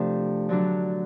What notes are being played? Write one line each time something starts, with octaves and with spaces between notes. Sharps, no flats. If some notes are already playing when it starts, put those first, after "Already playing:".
Already playing: C3 F3 A3 D4 G4
D3 F#3 A3 D4